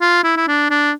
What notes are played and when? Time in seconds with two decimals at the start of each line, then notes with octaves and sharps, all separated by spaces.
0.01 F4
0.24 E4
0.37 E4
0.48 D4
0.70 D4